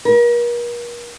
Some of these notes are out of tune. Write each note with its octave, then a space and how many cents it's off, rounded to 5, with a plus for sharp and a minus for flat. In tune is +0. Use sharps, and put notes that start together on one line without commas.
A#4 +40